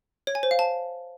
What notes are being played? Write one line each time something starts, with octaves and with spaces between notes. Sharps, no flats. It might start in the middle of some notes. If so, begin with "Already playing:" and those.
C#5
G#5
C5
F5
A5